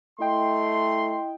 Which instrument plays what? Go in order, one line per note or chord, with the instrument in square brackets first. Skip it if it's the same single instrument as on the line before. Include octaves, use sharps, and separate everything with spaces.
[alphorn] A3 [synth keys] E4 D#5 G5 [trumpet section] C6